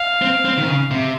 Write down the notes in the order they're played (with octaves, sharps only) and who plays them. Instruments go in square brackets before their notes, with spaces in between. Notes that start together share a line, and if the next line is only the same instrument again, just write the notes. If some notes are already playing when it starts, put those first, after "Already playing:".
Already playing: [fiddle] F5
[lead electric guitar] C4
C4
D#3
C#3
C3